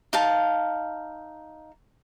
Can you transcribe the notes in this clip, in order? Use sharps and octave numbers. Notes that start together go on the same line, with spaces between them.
D#4 F5 A5